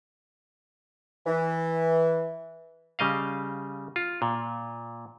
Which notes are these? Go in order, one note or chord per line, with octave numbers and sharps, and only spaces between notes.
E3
C#3 G3 D#5 F5
F4
A#2